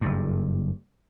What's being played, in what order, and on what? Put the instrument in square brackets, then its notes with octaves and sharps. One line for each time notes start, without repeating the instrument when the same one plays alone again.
[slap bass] F#1 G2